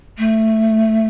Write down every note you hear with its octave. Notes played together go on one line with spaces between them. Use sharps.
A3